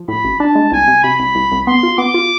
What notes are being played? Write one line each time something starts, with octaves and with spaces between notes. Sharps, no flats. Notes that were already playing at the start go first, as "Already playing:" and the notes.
Already playing: F3
A2 B5
A1
D4 A5
G#3
C2 G#5
C3
C3 B5
C2
C2
C2
B3 C6
F4
B3 D6
F4